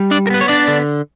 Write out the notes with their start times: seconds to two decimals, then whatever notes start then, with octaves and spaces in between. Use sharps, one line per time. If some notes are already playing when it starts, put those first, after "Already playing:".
Already playing: G3
0.11 D4 D5
0.27 A#4
0.30 B3 B4
0.41 C#5
0.48 D4 D5
0.68 D3